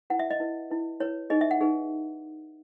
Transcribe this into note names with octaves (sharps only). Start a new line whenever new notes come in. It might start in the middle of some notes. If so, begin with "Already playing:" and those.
E4 B4 F#5
E5
D#5
E4 B4
E4 B4
E4 B4 C#5
D#4 G#4 B4 D#5
E5
F#5
D#4 G#4 B4